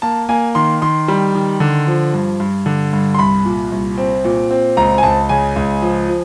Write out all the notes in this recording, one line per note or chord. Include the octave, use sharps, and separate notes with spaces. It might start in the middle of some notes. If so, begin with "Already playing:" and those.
A#3 A5
A#3 G#5
D#3 C6
D#3 C6
G3
D#3
D3
F3
G2
G2
D3
G2
C6
C2 B5
A#2
C2
C4
A#2
C4
C#2 A#5
G#5
C#2 A5
C#3 G#5
C#2
F3
F3